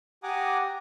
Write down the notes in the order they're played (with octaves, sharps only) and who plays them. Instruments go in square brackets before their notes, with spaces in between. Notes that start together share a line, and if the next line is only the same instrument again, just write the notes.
[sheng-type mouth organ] G4 F#5 G#5 A#5 D6 D#6